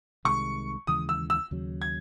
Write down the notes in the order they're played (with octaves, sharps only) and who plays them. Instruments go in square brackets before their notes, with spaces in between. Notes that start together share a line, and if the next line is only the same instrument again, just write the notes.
[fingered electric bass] C2 C3 D#3 G#3 [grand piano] C#6
[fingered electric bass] D#2 C#3 E3 G#3 [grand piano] D#6
[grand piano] E6
E6
[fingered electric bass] D#2 C#3 F#3
[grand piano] G#6